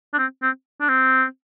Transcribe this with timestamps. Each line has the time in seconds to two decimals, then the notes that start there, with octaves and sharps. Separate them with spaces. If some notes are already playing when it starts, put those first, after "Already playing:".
0.14 D4
0.19 C4
0.43 C4
0.81 D4
0.89 C4